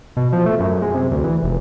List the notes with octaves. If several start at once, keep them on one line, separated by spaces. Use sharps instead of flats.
B2
F3
A3
F#2
G#3
C3
D2
E3
F1